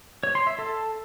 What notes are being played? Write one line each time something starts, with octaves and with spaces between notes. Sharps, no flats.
C#5
C6
E5
A4